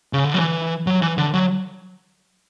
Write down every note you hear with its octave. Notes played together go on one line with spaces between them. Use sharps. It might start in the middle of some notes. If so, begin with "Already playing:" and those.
C#3
D3
F#3
E3
F#3
E3
D3
F#3